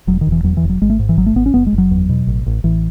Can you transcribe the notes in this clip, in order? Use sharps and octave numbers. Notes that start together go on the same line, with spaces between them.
E1 F#3
D#3
E1
E3
E2 F#3
E3
E1
F#3
G#1 G#3
A3
G#2
E3
G#1 F#3
A3
G#1 B3
C#4
F#1 B3
G#3
F#1
F#3
E2
B2
A1
A1
A1 E3